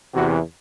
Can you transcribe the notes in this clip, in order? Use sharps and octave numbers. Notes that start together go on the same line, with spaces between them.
E2 C3 E3 F#4